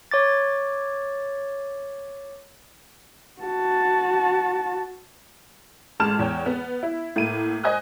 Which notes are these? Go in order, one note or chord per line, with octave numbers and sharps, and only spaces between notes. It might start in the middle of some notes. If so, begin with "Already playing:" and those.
C#5 D6 A6
F#4 A5
A1 G#3 A5 F6 E7
E2 C#5 G5
B3
E4
A2 A#3 E4 D#7
C5 D#5 G#5 D#6 F#6